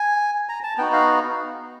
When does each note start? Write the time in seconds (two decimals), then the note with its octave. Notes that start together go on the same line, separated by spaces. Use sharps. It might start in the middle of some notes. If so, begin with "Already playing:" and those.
Already playing: G#5
0.49 A#5
0.64 A5
0.78 B3 D#4 F#4 G5
0.93 F5